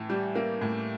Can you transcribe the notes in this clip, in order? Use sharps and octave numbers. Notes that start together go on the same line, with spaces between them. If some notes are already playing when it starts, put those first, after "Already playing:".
Already playing: A2 E3
G3
A#3
A2